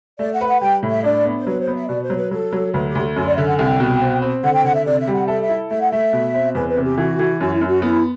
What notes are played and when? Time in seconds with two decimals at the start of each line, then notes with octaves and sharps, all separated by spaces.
0.19 A3 D5
0.33 F#5
0.41 B4
0.47 F#5
0.61 G3 G5
0.83 A2
0.90 E5
1.04 D4 D5
1.25 B3
1.39 C5
1.47 F#3 B4
1.61 C5
1.67 B3
1.75 E5
1.88 B2 D5
2.04 C5
2.10 F#3
2.17 B4
2.31 F#3 A4
2.53 F#3
2.74 D2 B4
2.88 G4
2.95 D2
3.16 F#2 F#4
3.27 D5
3.37 D3 E5
3.48 F#5
3.58 C2 G5
3.80 B2
4.01 C4
4.22 C4
4.44 D3 F#5
4.54 G5
4.64 D3 F#5
4.75 E5
4.85 C3 D5
5.00 E5
5.08 G3
5.14 F#5
5.28 A4 E5
5.43 E5
5.49 E4
5.70 A3 E5
5.81 F#5
5.91 A3 E5
6.13 B2
6.35 C4
6.55 E2 B4
6.69 B4
6.77 C3
6.84 G4
6.98 E3 F#4
7.19 E3
7.40 F#2 F#4
7.54 E4
7.61 F#2
7.68 F#4
7.82 B3 E4